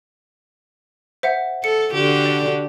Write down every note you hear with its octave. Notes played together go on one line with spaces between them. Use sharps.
C5 E5 F#5
A4 C#7
D3 F#4 G4
D5